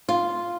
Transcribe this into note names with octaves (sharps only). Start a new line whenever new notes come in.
F4